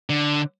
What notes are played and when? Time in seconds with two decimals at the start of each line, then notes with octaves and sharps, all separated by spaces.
0.10 D3